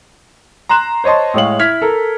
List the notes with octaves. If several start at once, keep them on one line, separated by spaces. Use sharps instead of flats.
A#5 C6 F#6 E7
C5 C#5 D#5 A5 C6
A2 G#3 C#5 F5 F#7
E4 F6 G#6 B6
A4 A#4